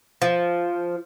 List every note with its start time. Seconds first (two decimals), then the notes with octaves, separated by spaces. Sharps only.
0.22 F3